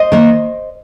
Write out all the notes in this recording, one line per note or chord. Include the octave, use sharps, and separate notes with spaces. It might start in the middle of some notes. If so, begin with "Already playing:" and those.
Already playing: C5 D#5
D#3 A#3 D#4